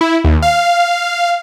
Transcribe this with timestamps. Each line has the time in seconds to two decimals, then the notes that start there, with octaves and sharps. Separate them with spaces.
0.01 E4
0.25 D#2
0.42 F5